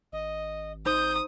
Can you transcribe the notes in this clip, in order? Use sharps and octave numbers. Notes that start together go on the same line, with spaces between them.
G#1 D#5
D#4 C5 D#6 G6